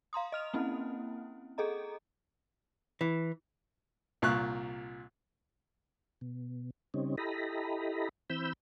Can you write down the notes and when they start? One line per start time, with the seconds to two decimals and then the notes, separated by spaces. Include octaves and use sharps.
0.13 F5 A#5 C6 D#6
0.32 D#5 F6 F7
0.54 A#3 C4 C#4 E4
1.58 G#4 A4 D#5 A#5
3.01 E3
4.22 C2 A#2 F5 C#6 F#6
6.21 B2
6.94 C#3 G3 C4 C#4 D#4
7.18 E4 G4 A4 D#5 A#5 B5
8.30 E3 C4 B5 E6 G6